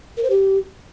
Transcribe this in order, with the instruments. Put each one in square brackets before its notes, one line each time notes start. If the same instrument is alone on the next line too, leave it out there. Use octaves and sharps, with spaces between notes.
[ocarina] A#4
C5
G4